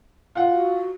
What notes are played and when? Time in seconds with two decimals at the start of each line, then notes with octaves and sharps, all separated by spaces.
0.35 F4 F#5
0.51 F#4